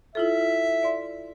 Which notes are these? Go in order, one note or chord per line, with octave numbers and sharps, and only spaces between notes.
E4 F4 A4 E5
D5 C6